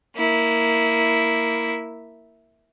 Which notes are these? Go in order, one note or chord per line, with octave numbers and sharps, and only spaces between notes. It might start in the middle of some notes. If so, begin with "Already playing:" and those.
A#3 E4